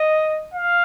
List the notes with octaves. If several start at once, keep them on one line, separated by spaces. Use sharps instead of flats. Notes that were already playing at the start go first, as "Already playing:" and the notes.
Already playing: D#5
F5